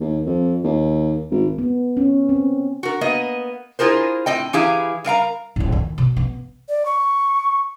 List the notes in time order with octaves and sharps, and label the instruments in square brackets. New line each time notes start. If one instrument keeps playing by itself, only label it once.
[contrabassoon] D#2
F2
D#2
G#1
[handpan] B3
C#4
C4
[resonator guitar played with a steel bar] F#4 A#4
A#3 B3 D#5
E4 F4 G#4 A#4 C5
A2 C4 D#5 G5
E3 E4 G4 G#4 F5 A#5
G3 A#4 F5 A#5
[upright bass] D#1 A2
D#3
B2
B3
[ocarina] D5
C#6